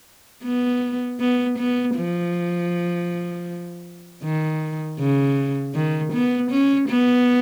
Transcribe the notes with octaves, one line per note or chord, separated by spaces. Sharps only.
B3
B3
B3
F3
D#3
C#3
D#3
B3
C#4
B3